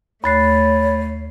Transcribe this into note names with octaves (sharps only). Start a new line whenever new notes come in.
D#2 A3 C#5 B5 F#6 A6 C7